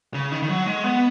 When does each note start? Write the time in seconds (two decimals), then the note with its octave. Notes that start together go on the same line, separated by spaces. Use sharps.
0.14 C#3
0.32 D#3
0.42 D#3
0.49 F#3
0.66 G#3
0.84 B3